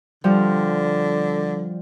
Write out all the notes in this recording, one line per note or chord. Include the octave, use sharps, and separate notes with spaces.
D3 F3 G3